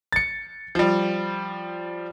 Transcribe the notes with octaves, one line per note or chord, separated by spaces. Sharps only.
A6 C#7
F3 G3